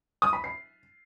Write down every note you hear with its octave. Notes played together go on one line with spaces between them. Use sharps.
D#6
B5
C7